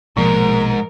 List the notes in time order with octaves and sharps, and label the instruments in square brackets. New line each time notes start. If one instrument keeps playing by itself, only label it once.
[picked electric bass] A#1 B2 A#3 [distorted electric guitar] G#2 [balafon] F3 [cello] A#4